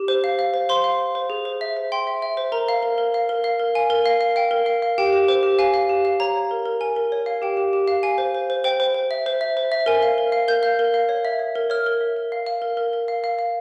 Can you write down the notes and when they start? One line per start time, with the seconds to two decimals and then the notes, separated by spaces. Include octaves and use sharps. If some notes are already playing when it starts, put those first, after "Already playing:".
Already playing: G4
0.08 C5
0.24 F5
0.39 F5
0.54 C5
0.69 C5 C6
0.84 F5
1.00 C5
1.15 C5
1.30 G#4
1.45 C5
1.61 E5
1.77 C5
1.92 G5 C6
2.07 E5
2.22 E5
2.37 C5
2.52 A#4 A#5
2.69 F5
2.83 A#4
2.98 A#4
3.14 F5
3.29 A#4
3.44 F5
3.59 A#4
3.75 F5 G#5
3.90 A#4
4.06 F5
4.21 F5
4.36 F5 G5
4.51 A#4
4.66 F5
4.82 F5
4.98 G4 G5
5.13 G4
5.28 C5
5.43 G4
5.59 F5 G#5
5.74 F5
5.89 G4
6.05 F5
6.20 C#5 A#5
6.36 C#5
6.51 A#4
6.66 A#4
6.81 A#4 G#5
6.96 A#4
7.12 C#5
7.26 F5
7.42 G4 G5
7.57 G4
7.73 G4
7.88 F5
8.03 F5 G#5
8.18 C5
8.35 C5
8.50 C5
8.64 C5 G5
8.80 C5
8.95 C5
9.11 E5
9.26 C5
9.41 E5
9.57 C5
9.72 E5
9.86 A#4 G#5
10.02 F5
10.18 A#4
10.32 F5
10.48 A#4 G6
10.63 F5
10.79 A#4
10.94 F5
11.09 C#5
11.25 E5
11.39 C#5
11.55 A#4
11.70 C#5 F6
11.86 A#4
12.01 E5
12.16 A#4
12.32 F5
12.46 F5
12.62 A#4
12.77 A#4
12.93 A#4
13.08 F5
13.24 F5
13.39 F5